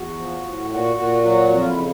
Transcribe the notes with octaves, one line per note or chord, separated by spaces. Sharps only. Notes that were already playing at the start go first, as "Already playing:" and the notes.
Already playing: E2 F#4
F3
A2
A#2 F#4
A#2 F#4
F#3 F#4
F2 F#4
F4
E4
C#3